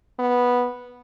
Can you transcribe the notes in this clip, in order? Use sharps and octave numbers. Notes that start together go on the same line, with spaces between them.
B3